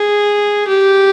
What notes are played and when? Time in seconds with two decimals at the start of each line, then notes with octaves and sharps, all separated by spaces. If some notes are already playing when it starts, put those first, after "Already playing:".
Already playing: G#4
0.68 G4